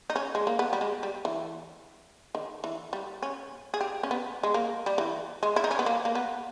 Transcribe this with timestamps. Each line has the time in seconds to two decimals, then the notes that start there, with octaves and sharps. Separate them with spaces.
0.10 D#4
0.16 C#4
0.35 G#3
0.47 A#3
0.59 B3
0.73 G3
0.81 G#3
1.03 G3
1.25 E3
2.35 D#3
2.64 E3
2.93 G3
3.23 C#4
3.74 G#4
3.81 G4
4.03 C#4
4.11 B3
4.43 G#3
4.54 A#3
4.86 G3
4.98 E3
5.43 G#3
5.56 E4
5.64 D#4
5.71 C#4
5.79 B3
5.86 A#3
6.05 A#3
6.15 B3